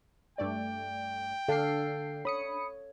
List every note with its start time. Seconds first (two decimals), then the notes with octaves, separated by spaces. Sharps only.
0.38 G2 A3 D5 G5
1.48 D3 D4 A4 F5 C7
2.25 C#5 B5 D#6 C#7